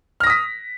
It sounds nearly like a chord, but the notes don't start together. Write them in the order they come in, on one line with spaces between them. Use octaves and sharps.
F6 A#6 D#6 B6